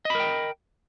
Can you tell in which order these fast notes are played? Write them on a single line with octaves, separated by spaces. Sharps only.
D#5 B5 A#4 G5